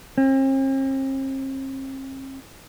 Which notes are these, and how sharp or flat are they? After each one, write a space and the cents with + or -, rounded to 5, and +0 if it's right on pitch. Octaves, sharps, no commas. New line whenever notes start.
C4 +45